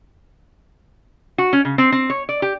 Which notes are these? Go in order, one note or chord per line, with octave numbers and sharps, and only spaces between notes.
F#4
C#4
C#3
C4
C4
C#5
D5
G4